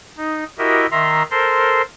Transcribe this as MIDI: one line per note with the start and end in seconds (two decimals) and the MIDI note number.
0.17 0.44 63
0.58 0.86 64
0.58 0.86 66
0.58 0.86 67
0.58 0.86 70
0.58 0.86 75
0.58 0.86 76
0.91 1.23 51
0.91 1.23 76
0.91 1.23 82
0.91 1.23 84
1.31 1.82 69
1.31 1.82 70
1.31 1.82 72
1.31 1.82 84